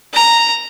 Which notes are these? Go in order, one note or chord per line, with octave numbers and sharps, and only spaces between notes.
A#5